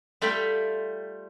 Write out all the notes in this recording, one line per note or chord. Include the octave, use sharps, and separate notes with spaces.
G3 A3 F4 E5 G5 B5